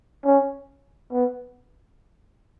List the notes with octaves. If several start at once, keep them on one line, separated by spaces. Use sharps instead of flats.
C#4
B3